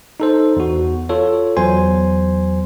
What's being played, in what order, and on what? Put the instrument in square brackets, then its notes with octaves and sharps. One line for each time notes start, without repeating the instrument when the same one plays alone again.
[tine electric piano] D#4 A4 C5
E2 F#4
F4 A4 C#5
E2 F#3 C5 G#5 C6